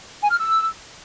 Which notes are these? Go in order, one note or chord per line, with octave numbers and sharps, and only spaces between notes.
G#5
F6
E6